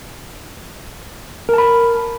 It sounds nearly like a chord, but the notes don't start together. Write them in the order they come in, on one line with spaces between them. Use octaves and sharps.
A#4 A5 B5